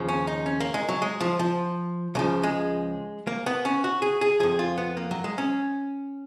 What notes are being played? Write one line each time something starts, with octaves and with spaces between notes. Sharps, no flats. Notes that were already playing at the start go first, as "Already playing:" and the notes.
Already playing: D#2 C#3 F3
C#4
D#4
C#4
A#3
G#3
F#3
G#3
F3
F3
C#2 C#3 F3 F#3
G#3
A#3
B3
C#4
F#4
G#4
G#4
F2 F3 G#4
F4
B3
A#3
F#3
G#3
C#4